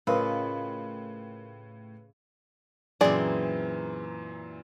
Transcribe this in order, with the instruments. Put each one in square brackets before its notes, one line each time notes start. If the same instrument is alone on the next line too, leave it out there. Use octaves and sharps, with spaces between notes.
[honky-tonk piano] A2 [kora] C#3 F4 D#5 [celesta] A#4 [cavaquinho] B4
[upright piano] F#2 A#2 [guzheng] E3 C4 [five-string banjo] G#4 D5